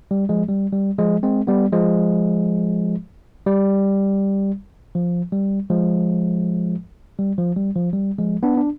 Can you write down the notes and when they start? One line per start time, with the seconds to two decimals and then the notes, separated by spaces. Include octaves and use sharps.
0.11 G3
0.29 F3 G#3
0.49 G3
0.73 G3
0.98 F3 G#3
1.23 G#3 C4
1.47 G3 B3
1.73 F3 G#3
3.46 G3
4.95 F3
5.32 G3
5.70 F3 G#3
7.18 G3
7.38 F3
7.56 G3
7.76 F3
7.93 G3
8.18 F3 G#3
8.43 B3 D4
8.57 D4